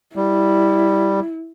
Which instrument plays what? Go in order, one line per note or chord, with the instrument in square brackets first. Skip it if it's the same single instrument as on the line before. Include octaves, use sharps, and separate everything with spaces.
[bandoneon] G3 [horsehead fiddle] E4